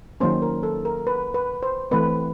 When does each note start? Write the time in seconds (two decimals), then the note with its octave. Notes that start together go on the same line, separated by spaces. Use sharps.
0.20 D#3 F#3 A#3 C#4 C5
0.42 A#4
0.63 A4
0.85 A#4
1.07 B4
1.34 B4
1.63 C5
1.91 E3 A3 C4 B4